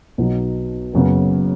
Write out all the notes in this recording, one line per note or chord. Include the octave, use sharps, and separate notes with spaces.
B1 B2 F#3 D#4
F#1 F#2 C#3 B3